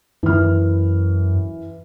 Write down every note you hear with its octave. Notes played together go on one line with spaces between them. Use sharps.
F#2 E3 F6